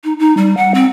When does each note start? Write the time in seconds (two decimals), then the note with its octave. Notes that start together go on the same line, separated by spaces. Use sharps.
0.04 D#4
0.19 D#4
0.37 G3
0.57 F#5
0.74 C4